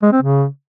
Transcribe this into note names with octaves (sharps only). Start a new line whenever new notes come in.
G#3
C4
C#3